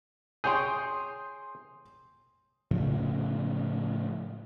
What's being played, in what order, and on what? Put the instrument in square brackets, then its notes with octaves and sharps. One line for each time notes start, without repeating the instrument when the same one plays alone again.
[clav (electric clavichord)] G#4 C#5 G5 [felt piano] C6 D#6 G6
[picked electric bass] A2 C#3 F3